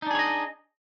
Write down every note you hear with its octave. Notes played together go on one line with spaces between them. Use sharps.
D4 D#4 G#4 C#5 D#5